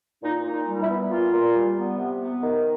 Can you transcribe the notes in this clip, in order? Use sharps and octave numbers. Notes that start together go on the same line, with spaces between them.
A#2 D#4
A#2
D#4
G3
E4
B3
A#2 F4
A#2
G3
B3
C3
B3
D#3